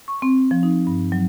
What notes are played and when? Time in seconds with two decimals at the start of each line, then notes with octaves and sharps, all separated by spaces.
0.08 C#6
0.22 C4
0.51 F3
0.63 D#4
0.87 G2
1.12 F#3